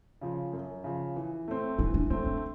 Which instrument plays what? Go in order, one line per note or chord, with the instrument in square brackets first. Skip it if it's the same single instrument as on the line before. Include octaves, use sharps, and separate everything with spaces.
[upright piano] C#3 F3
F#2
C#3 F3
E3
A3 C4
[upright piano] E3 [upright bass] D#4
[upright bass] D4
[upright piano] A3 C4 [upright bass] C#4
[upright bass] D4